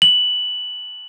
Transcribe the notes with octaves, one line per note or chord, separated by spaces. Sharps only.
F#7